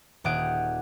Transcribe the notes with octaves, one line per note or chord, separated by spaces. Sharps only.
D#1 G4 G#4 F#5 D7